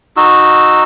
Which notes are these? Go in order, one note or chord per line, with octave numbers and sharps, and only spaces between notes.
D#4 F#4 E6